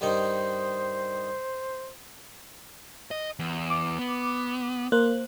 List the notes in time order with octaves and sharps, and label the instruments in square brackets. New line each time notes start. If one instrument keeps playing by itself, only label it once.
[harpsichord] G2 D#3 D#4 [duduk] C5
[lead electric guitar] D#5
E2
[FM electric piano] D6
[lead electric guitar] B3
[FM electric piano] A#3 C5 F#6